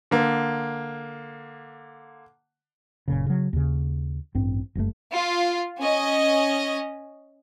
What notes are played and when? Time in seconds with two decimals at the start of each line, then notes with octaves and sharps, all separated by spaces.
0.11 D3 A#3
3.08 F#1 A#2 C#3
3.26 C#3 F#3
3.53 D#2 C#3
4.35 A1 G2 C4
4.75 F#1 G2 C3 A3
5.14 F4
5.80 C#4 D#5